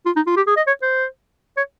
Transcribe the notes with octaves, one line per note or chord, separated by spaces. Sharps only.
F4
D#4
F4
G4
G#4
D#5
C#5
C5
C#5